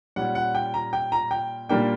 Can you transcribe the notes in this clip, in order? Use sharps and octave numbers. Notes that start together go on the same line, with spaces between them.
A#2 G3 C#4 F#5
F#5
G5
A#5
G5
A#5
G5
A#2 G3 A#3 D4 G5